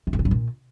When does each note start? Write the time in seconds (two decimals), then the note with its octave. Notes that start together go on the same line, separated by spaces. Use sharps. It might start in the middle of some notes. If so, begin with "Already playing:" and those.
0.07 D#3
0.13 G2
0.19 C#3
0.25 G2
0.31 A#2